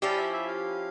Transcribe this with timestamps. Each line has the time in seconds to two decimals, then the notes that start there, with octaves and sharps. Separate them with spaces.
0.02 F3 C#4 E4 G4 D5
0.18 E5
0.33 E5
0.48 F5